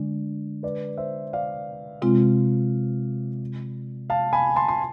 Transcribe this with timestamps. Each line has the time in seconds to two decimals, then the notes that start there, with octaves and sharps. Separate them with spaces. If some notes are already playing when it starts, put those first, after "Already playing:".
Already playing: D3 G#3 D4
0.63 B4 D5
0.97 C5 E5
1.33 D5 F5
2.02 C3 G#3 C4 F4
4.10 F5 A5
4.33 G#5 B5
4.56 A5 C6
4.68 C6